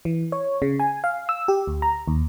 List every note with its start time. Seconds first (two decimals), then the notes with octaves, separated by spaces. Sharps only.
0.05 E3
0.32 C#5
0.62 C#3
0.80 G#5
1.04 F5
1.29 E6
1.48 G4
1.67 D2
1.82 A#5
2.08 D#2